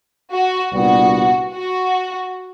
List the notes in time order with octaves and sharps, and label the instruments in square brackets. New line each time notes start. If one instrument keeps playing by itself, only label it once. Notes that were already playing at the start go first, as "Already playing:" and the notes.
[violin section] F#4
[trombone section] C2 A#2 G3 B3 D4 [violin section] F#4
[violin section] F#4